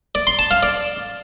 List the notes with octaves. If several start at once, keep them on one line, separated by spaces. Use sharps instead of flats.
D5
C6
A5
F5
D5